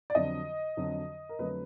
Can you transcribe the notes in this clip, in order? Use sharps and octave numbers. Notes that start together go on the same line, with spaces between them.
D5
F2 D3 F#3 D#5
F2 D3 F#3
A#4
F2 D3 F#3 A3 B4